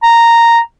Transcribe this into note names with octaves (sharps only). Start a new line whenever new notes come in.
A#5